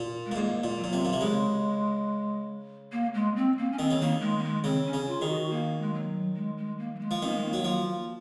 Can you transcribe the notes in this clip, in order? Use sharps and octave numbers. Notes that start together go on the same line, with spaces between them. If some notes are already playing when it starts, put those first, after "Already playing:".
Already playing: A#2
G#3
A#2
G#2 A#3
A#2
F#3
A#2
C3
A#2
C3
C#3 G#3
A#3
G#3
C4
A#3
C#4
D#3 C4
C#3
D#3 A#3
G#3
A#3
G#3
C#3 C4
C#4
C#3
F4
D#3 G#4
F#4
A#3
G#3
F#3
G#3
G#3
A#3
F#3
G#3
F3
D#3 C4
A#3
G#3
A#3
F#3
F3